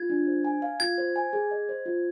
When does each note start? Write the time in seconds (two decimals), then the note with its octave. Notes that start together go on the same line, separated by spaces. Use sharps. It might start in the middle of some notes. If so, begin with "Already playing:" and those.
Already playing: F4 G#6
0.10 D4
0.27 C5
0.45 G#5
0.62 F5
0.80 F4 G#6
0.98 C5
1.16 G#5
1.33 G#4
1.51 D#5
1.69 C5
1.86 F4